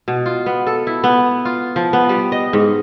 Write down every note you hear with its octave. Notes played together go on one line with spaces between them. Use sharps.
B2
F4
B3
A4
E4
B3
F4
F3
B3
G3
D#5
G#2